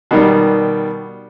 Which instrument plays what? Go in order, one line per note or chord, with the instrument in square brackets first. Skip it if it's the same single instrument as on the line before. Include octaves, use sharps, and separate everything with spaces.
[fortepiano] B2 D#3 G3